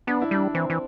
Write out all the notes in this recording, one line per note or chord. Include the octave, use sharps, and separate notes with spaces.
B3 D4
E4
G3 D4
E3 C4
E3